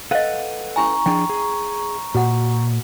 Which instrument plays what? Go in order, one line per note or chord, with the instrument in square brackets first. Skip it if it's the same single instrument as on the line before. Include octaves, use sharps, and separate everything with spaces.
[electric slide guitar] A4 B4 F#5 [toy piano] D#5 F5
[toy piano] C#4 E4 G#5 [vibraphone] A#5 C#6
[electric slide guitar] F3 D4 G#4 [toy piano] G5
[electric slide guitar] G#4
[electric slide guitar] A#2 [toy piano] F#4 F#5